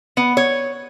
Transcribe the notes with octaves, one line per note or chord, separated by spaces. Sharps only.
B3
C#5